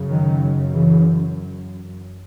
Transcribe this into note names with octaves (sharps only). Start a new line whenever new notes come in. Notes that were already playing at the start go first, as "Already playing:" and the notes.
Already playing: F#2 C#3
D#3 F#3
C#3 E3